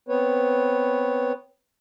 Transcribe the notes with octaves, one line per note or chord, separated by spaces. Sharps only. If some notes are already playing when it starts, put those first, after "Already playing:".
B3 C4 B4 C#5